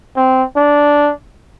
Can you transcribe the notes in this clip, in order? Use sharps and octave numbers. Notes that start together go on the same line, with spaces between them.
C4
D4